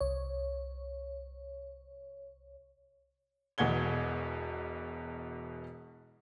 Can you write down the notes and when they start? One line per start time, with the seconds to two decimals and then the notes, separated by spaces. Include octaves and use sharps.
0.01 C2 C#5
3.58 E1 E2 B2 F#5 G#6 G7